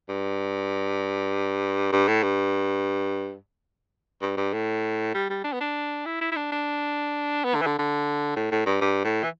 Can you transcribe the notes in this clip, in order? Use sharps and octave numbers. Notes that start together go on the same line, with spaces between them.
G2
G2
A2
G2
G2
G2
A2
G3
G3
D4
B3
D4
E4
E4
E4
D4
D4
B3
D3
E3
D3
D3
A2
A2
G2
G2
A2
E3